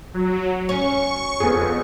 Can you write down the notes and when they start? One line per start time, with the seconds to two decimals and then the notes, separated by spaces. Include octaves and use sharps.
0.14 F#3
0.69 C#4 C#6
1.40 F2 B3 G#4